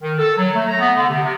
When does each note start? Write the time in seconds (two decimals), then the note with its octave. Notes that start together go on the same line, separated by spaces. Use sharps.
0.02 D#3
0.18 A4
0.38 F#3
0.55 A3
0.68 A#5
0.79 B3
0.96 D3
1.10 C3
1.23 C3